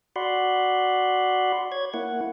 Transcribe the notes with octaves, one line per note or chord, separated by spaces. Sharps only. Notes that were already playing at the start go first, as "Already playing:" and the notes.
F#4 D5 F#5 B5 C6
C#5 G#6
A#3 E4 F#5